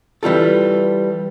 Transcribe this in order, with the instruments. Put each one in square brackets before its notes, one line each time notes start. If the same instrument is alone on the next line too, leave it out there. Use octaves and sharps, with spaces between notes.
[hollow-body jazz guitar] E3 G3 F4 A4